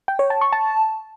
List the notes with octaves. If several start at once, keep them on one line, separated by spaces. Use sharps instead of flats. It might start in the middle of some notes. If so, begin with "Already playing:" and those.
G5
C#5
A5
C#6
A5